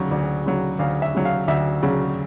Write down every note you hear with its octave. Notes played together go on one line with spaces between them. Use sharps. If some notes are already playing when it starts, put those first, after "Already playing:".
Already playing: D2 C#3 F#3
D2
C#3 F#3
D2 F5
E5
C#3 F#3
F5
D2 E5
C#3 F#3